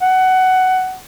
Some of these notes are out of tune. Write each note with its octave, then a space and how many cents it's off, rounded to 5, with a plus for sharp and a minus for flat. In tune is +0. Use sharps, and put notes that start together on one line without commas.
F#5 +15